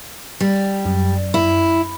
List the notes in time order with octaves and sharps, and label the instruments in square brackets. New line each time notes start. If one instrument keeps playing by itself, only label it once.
[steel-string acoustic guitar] G3
[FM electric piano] F#2
[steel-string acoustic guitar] E4